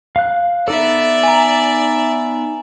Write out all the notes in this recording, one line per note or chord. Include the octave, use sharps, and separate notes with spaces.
F5 F#6
B3 D#4 A4 D5 E5
G#5 A#5